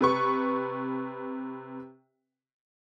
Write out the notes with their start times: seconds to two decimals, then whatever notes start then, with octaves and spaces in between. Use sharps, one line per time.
0.01 C3 B4 C#6